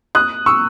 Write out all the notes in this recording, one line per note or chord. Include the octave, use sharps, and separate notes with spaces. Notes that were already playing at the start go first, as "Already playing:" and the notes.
D#6 F#6
C#6 E6